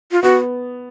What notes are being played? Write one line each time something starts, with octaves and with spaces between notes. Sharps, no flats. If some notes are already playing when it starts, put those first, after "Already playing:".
F4
B3 F#4